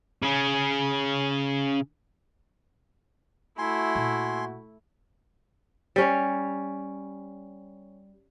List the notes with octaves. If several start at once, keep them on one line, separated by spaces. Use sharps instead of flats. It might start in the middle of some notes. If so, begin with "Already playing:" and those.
C#3 C#4
A3 E4 F#4 G#5 C6
A#2
G3 C#4 C#5